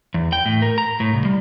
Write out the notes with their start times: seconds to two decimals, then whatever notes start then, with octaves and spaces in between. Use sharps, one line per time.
0.14 E2
0.33 G5
0.46 A2
0.62 A#4
0.78 A#5
1.00 A2
1.13 C2
1.25 G3